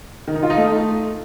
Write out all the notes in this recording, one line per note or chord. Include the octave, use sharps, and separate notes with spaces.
D#3
D#4
F4
D#4
A3